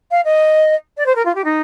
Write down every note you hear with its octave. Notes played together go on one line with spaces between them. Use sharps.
F5
D#5
D5
C5
A#4
F4
G4
D#4